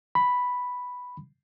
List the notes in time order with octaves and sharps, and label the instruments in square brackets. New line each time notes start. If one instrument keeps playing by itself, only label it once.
[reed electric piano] B5